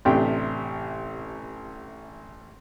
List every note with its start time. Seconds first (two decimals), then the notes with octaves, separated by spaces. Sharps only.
0.05 A1 C3 A3 D4 G4 G5